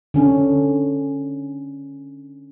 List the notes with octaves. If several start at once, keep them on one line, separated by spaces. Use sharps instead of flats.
D3 C#4 D4